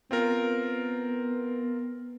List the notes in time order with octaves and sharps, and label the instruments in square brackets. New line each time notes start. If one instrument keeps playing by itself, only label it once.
[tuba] B3 [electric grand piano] C4 F4 A#4